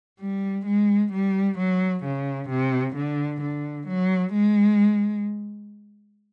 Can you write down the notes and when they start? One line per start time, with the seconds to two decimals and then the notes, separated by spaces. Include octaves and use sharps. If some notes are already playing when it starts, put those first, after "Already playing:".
0.20 G3
0.66 G#3
1.13 G3
1.58 F#3
2.04 C#3
2.50 C3
2.96 D3
3.41 D3
3.88 F#3
4.33 G#3